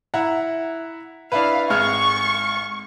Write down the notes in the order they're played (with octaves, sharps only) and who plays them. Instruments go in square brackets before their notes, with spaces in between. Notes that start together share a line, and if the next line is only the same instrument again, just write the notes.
[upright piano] E4 F#5 A#5
[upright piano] D4 E4 B4 [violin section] F5
[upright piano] G#1 G#3 F6 [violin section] C#6